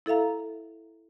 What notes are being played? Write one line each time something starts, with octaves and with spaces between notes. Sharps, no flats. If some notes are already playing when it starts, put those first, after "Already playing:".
E4 A4 E5 F5 A#5